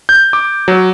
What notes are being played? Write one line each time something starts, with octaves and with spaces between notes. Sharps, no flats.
G6
D6
F#3